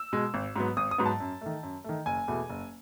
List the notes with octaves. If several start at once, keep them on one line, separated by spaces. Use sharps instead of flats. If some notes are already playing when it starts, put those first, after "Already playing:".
Already playing: E6
B2 G#3
G#1
G#2 F#3 B3
G#1 D#6
D#6
G#2 F#3 B3
A5
F#2
D#3 A3
F#2
D#3 A3
F#1 G#5
E2 B2 A3
F#1